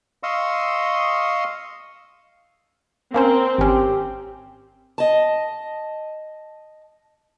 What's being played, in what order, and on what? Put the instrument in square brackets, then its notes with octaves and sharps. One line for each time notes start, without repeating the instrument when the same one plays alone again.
[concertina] D#5 F5 C6 C#6 D#6 E6
[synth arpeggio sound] A#3 C#4 C5 [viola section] C4 [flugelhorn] A#4
[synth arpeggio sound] G#1 C#4 [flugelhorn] G4
[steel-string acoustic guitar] D#5 A5